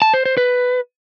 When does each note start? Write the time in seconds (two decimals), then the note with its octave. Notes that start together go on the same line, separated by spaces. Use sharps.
0.02 A5
0.14 C5
0.26 C5
0.37 B4